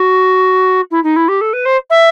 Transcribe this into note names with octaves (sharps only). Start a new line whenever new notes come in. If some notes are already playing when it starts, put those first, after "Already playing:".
Already playing: F#4
E4
D#4
E4
G4
A4
B4
C5
E5